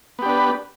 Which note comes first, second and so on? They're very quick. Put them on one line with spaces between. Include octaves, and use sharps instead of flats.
B3 G4 D4 B4